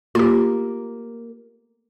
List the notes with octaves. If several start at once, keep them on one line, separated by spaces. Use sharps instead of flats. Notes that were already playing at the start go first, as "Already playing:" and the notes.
A#3 F4 G4